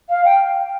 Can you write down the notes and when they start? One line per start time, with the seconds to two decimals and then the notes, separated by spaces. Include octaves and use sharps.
0.10 F5
0.25 G5